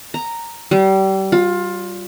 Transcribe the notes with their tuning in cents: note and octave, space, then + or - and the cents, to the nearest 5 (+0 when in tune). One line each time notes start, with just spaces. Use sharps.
A#5 -5
G3 -30
F4 +20